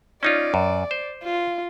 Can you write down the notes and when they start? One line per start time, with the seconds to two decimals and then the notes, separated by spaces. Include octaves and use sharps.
0.23 C#4 D#4 F4 D5
0.54 F#2
0.91 C5
1.24 F4